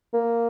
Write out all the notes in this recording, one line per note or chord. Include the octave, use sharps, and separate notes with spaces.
A#3